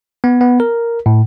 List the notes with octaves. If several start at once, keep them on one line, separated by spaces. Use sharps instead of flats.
B3
B3
A#4
A2